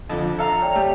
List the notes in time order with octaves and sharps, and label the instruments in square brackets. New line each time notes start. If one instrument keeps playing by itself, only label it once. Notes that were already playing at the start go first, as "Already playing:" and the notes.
[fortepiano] F2 D3 F3
[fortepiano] A4 E5 F5 [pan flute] A#5
[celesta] C#5 D5 G5
[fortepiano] G3 A3 G4